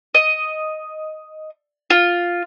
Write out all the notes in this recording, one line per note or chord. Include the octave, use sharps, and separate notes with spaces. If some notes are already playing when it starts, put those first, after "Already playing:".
D#5
F4